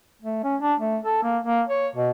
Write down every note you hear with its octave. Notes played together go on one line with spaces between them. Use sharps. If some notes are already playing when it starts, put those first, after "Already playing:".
A3
C#4
D4
A3
A4
A#3
A#3
C#5
B2